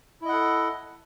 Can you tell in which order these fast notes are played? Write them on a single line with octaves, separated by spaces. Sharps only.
E4 D#5 F#5 A4